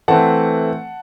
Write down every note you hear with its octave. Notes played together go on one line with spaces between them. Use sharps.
E3 A3 C4 F#5 A5